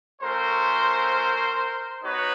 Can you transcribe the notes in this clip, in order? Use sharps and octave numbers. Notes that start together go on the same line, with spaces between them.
A3 C#4 F#4 A#4 C5
B3 D#4 F#4 B4 C#5